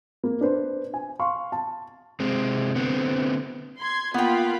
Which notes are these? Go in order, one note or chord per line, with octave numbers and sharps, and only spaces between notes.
A#3
D4 B4 C5
G#5
F5 C6 C#6
A5
C3 G#3 C4
D3 B3 C4
C6 G#6
A#3 B3 F4 G5 B5